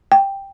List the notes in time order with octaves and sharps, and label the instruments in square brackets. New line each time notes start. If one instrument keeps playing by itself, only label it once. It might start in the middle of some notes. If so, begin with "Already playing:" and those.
[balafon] G5